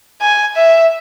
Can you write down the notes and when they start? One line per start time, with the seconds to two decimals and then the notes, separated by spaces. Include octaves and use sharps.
0.21 G#5
0.56 E5